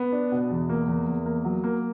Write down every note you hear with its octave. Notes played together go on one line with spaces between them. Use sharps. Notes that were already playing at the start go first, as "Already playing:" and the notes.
Already playing: B3
D4
B2
E2
A#3
E2
E2
A#3
F#3
A#3